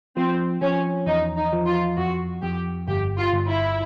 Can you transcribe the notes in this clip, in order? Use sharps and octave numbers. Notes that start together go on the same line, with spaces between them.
F3 C4
F3 C#4
E2 D#4
D#4
F3
F4
F2 F#4
F2 G4
G1 G4
F4
G1
E4